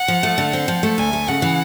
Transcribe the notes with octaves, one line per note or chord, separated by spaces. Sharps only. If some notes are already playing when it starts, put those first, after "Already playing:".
Already playing: F#5
F3
A3
D3
C4
F3
A3
D2 G#5
A3
C#3 F#5
E3